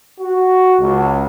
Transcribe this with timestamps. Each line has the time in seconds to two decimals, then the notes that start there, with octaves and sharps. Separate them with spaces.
0.20 F#4
0.79 C#2